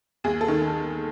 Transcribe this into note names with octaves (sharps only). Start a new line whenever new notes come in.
D#2 G#4
A4
D#3